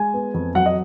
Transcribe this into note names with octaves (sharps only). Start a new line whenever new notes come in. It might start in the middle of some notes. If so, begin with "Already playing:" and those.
Already playing: G#3 G#5
B3
F2
F#3 F#5
D#5